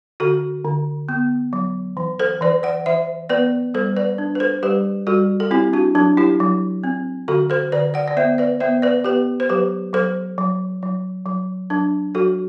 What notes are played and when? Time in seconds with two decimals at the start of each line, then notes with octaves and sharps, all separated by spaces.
0.20 D3 F#4 A4
0.65 D3
1.09 B3
1.53 F#3
1.97 E3
2.19 A4 C5
2.41 E3 B4 D5
2.63 D5 F#5
2.86 E3 C5 E5
3.29 B3 B4 D5
3.74 G3 A4 C5
3.96 B4 D5
4.18 D4
4.35 B4
4.40 A4 C5
4.63 G3 G4 B4
5.07 G3 F#4 A4
5.40 A4
5.51 C4 E4 G4
5.73 D4 F#4
5.95 F#3 D4
6.17 E4 G4
6.40 F#3
6.84 C4
7.28 D3 F#4 A4
7.50 A4 C5
7.72 D3 B4 D5
7.94 D5 F#5
8.08 D5
8.17 B3 C5 E5
8.38 B4 D5
8.60 B3 C5 E5
8.82 B4 D5
9.04 B3 G4 B4
9.40 C5
9.49 F#3 G4 B4
9.93 F#3 A4 C5
10.38 F#3
10.83 F#3
11.26 F#3
11.70 F#3 D4
12.15 F#3 F#4 A4